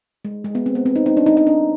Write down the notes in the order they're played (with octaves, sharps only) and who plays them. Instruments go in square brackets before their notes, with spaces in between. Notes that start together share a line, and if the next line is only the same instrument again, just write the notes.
[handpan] G#3
G#3
B3
C4
B3
C4
D#4
D#4
D4
D#4
D#4
D4